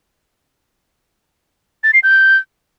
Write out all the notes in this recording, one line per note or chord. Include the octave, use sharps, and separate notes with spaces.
A6
C7
G6